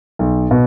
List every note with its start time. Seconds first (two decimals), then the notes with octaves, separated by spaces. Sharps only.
0.19 B1
0.51 B2